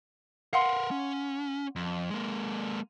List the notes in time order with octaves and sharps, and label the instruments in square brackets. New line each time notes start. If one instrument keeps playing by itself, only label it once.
[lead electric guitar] A#4 B4 [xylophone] F5 F#5 C6
[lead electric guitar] C#4
F2
G#3 A#3